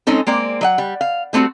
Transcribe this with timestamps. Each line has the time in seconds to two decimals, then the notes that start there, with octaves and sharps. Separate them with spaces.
0.07 G#3 C4 C#4 D#4 A4
0.27 G#3 A#3 C4 D5
0.61 F#3 D#5 F#5
0.78 G3
1.01 F5
1.33 G3 A3 C4 E4 F#4